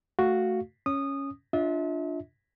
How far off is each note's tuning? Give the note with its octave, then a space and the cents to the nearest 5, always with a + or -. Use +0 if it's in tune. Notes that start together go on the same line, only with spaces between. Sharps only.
A3 +0 F#4 +0 F5 +0
C#4 +0 D#6 -15
D4 +0 F4 +0 E5 -40